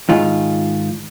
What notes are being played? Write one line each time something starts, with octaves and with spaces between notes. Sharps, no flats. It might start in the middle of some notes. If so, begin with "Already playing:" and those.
G#2 D#3 F4